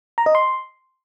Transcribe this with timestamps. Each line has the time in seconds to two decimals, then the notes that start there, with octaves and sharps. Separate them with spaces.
0.18 A#5
0.26 D#5
0.35 C6